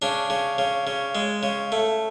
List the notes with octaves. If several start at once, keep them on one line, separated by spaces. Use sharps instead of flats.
C#3 D4
C#3
C#3
C#3
G#3
C#3
A3